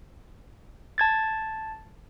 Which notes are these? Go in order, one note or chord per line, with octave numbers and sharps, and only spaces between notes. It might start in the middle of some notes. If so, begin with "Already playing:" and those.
A5 G#6 A6